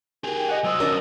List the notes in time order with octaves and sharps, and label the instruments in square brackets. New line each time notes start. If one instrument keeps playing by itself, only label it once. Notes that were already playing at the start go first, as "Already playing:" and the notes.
[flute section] D#4 A#4 G5 [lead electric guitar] G4 G#4
[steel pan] D#5 F#5
[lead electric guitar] F#3 C5 [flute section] D#4 D#6 E6
[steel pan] C#4 D4 D5 [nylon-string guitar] A#4